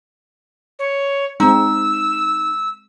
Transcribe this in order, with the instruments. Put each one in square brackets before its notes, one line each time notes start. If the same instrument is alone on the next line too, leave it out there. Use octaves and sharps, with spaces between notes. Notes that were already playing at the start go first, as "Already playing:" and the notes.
[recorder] C#5
[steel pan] G#3 C4 [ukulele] D#4 [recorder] E6